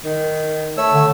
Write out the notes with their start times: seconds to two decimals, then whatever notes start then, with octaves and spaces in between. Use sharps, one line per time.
0.05 D#3
0.77 A3 C#5 E6
0.93 D3